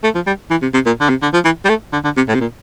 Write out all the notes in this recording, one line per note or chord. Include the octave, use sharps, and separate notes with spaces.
A3
F3
G3
E3
C3
C3
A#2
D3
C3
D3
F3
E3
G3
A3
D3
D3
C3
A2
C3
A#2